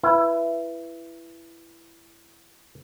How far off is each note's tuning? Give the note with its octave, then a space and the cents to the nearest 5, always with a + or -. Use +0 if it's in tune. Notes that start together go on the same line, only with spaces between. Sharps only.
E4 +20 B4 +0